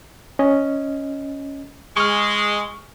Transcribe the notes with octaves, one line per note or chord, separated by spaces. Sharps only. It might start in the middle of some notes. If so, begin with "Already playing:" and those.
C#4 D#5
G#3 C#6 F6